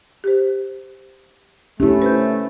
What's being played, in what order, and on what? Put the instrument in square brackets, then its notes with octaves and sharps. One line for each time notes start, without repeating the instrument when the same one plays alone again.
[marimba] G4 C5
[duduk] A3 [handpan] C#4 E4 [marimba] G4
[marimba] B4 C5 G6